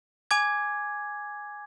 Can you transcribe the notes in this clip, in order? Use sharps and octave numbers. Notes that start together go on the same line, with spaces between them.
G#5 D6 G#6